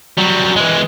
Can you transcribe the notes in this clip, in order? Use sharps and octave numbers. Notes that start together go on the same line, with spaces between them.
F#3 G3
E3 G#3